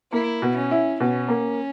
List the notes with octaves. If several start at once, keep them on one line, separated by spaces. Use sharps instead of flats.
A#3 E4
B2
C#4
E4
B2 C#4
A#3